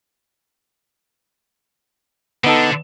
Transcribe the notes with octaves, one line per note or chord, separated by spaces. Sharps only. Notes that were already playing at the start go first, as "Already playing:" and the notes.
D3 B3 D#4 A4